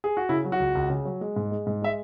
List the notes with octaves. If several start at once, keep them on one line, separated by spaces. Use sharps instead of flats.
G#4
F#4
C#3 E4
F#3
F#4
C#2
C#2
C#3
F#3
G#3
G#2
G#3
G#2
G#3 E5